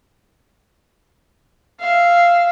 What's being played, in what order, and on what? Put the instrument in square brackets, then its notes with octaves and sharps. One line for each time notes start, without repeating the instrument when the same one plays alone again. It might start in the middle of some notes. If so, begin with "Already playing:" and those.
[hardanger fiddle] E5 F5